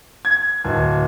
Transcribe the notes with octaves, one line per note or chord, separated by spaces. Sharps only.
G#6
D1